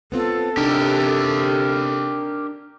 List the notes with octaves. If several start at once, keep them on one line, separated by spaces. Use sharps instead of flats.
B3 C4 F4 A4
C3 D4 D#4 G4 A#4